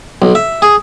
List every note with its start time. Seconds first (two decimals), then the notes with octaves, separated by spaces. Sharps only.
0.22 B1
0.35 E5
0.62 G#4